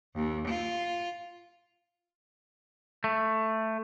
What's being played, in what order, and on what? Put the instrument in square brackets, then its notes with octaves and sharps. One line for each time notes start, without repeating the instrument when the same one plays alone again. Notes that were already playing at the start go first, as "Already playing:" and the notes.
[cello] D#2
F4
[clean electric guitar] A3